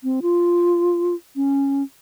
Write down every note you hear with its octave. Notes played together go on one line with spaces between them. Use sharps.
C4
F4
C#4